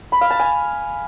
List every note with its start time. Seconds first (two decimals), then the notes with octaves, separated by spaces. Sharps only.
0.12 B5
0.21 F5
0.30 A5
0.39 G#5